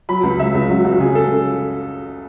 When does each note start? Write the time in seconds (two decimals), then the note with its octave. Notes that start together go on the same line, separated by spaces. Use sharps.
0.09 F#3 B5
0.23 C#2
0.39 C#3 E5
0.55 C#2
0.69 F#3 F#4
0.84 C#2 F#4
1.00 C#3 G#4
1.15 A4